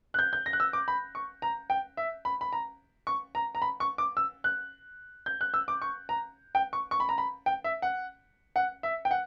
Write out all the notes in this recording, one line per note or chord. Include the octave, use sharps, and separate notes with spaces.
F#6
G6
G6
A#6
F#6
E6
D6
B5
C#6
A#5
G5
E5
B5
B5
A#5
C#6
A#5
A#5
B5
C#6
D6
E6
F#6
G6
F#6
E6
D6
C#6
A#5
G5
C#6
C#6
B5
A#5
B5
G5
E5
F#5
F#5
E5
G5
F#5